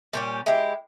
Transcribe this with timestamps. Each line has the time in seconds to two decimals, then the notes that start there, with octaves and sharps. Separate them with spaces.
0.13 A#2 G3 C#4 G4
0.46 G#3 E4 G4